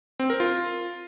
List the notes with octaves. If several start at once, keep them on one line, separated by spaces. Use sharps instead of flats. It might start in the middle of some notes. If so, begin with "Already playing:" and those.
C4
A#4
F4